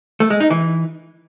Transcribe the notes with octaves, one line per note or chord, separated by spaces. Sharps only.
A3
G#3
D#4
E3